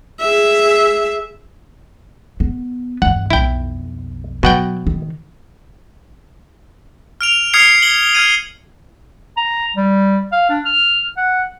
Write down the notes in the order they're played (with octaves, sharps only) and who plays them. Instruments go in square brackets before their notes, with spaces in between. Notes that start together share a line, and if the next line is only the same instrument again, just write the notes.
[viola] G#4 E5
[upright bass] B3
[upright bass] E2 G2 [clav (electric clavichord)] F#5
[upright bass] B1 F2 [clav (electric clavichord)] E4 G5
[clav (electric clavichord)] B2 F#5 G5 [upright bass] F#3
[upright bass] D#3
[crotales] F6 D7 F7
D#6 F6 G#6 C7 C#7 F7
F#7 G7
F6 G#6 D#7
[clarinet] A#5
G3
F5
D4
F6
F#5